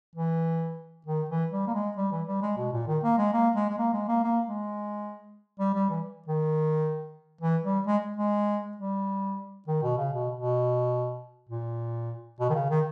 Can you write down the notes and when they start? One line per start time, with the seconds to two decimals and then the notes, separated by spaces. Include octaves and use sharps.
0.15 E3
1.06 D#3
1.29 E3
1.52 G3
1.67 A#3
1.74 G#3
1.97 G3
2.12 E3
2.27 G3
2.42 G#3
2.57 B2
2.72 A#2
2.88 D#3
3.03 A#3
3.18 G#3
3.33 A#3
3.56 G#3
3.69 G#3
3.78 A#3
3.93 G#3
4.08 A#3
4.24 A#3
4.46 G#3
5.60 G3
5.75 G3
5.90 E3
6.28 D#3
7.41 E3
7.64 G3
7.87 G#3
8.17 G#3
8.77 G3
9.68 D#3
9.83 B2
9.98 C#3
10.13 B2
10.36 B2
11.49 A#2
12.40 B2
12.50 D#3
12.55 C#3
12.70 D#3